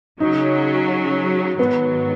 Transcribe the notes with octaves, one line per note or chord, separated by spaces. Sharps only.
C#3 F#3 C#4 D#4
G#2 D#3 F#3 B3